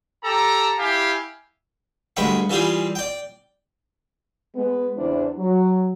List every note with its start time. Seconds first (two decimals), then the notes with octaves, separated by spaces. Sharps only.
0.24 G4 A4 A#5
0.79 E4 G4 F5 G#5
2.17 D2 G2 G#3 G5 B5 C#6
2.50 E3 G3 F4 G4 G#4
2.95 D5 G5
4.55 G#3 B3
4.96 E2 C#3 E3 D4 C5
5.37 F#3